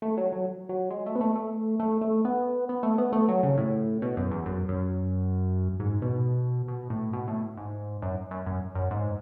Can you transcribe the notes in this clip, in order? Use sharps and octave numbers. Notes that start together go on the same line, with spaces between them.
A3
F#3
F#3
F#3
G#3
A3
B3
A3
A3
A3
A3
B3
B3
A3
B3
A3
F#3
C#3
A2
B2
F#2
E2
F#2
F#2
G#2
B2
B2
A2
B2
A2
G#2
F#2
F#2
F#2
F#2
G#2